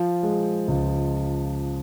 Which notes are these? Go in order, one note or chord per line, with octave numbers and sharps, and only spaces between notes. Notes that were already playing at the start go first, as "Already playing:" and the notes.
Already playing: F3
G#3
C#2